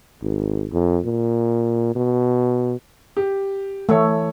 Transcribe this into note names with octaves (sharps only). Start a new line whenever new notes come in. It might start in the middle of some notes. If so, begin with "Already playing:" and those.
G#1
F2
A#2
B2
G4
E3 A3 C#5